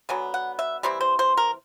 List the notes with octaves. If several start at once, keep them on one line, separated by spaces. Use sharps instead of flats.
D3 F#3 B3 G#5
F#5
E5
E3 G3 C4 E4
C5
C5
A#4